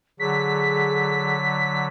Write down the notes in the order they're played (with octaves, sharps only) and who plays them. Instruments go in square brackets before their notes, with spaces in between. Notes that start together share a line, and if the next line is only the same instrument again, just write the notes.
[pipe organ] D3 F#3 [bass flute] G#4 [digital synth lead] B6